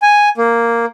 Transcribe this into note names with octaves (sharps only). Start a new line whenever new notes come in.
G#5
A#3